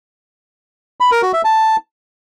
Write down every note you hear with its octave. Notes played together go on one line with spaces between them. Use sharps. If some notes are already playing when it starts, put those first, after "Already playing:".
B5
A#4
F#4
E5
A5